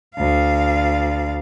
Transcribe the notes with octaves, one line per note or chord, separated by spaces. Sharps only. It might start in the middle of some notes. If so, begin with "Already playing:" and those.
D2 F5